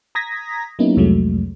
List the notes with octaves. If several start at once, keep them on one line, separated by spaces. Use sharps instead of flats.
A#5 D#6 G#6 A#6 B6
F#3 A#3 B3 C#4 D#4 E4
C2 F2 C3 F#3 G#3 A3